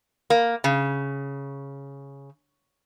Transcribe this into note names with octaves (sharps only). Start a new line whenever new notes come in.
A#3
C#3